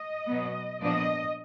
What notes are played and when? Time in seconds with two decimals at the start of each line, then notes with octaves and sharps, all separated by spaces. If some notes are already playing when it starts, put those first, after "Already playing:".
Already playing: D#5
0.28 B2 F#3 B3
0.80 A#2 F3 B3 D4 D#5